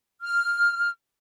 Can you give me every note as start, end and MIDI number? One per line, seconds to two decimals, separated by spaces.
0.22 0.90 89